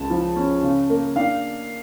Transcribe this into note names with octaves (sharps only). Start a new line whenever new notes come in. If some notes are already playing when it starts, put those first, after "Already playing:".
Already playing: C#2 A5
F3
C#4
C#3
A#3
D4 F5